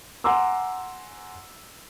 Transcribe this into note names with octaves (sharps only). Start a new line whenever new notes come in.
F#5 G#5 A#5 C6 D6 E6